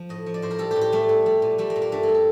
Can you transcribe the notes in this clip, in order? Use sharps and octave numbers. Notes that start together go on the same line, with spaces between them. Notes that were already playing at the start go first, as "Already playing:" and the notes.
Already playing: F3
A2 D#5
F3
D5
A2 C5
A#4
G3 A4
A2 G4
G4
G3 A3
A2
G3
A#2
G3 A3
A#3
A#2
A#3
G2 A3
A#3
G3
A4